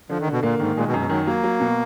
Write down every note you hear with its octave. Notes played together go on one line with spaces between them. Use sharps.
D3 F3
D#3
B2 D3
A#2 A#3
G#2 D#3
A#2 G#3
B2
F#2
B2
D#3 F#3
F#3 A#3
F#3
B2